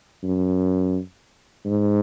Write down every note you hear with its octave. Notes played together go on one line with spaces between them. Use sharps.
F#2
G#2